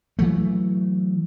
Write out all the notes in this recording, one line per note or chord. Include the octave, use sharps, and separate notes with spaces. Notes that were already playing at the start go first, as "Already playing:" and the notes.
E3 F#3 A3